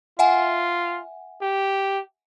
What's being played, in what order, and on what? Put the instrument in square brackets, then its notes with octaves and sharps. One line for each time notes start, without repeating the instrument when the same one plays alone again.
[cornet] F4 [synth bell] E5 F#5 G#5
[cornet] G4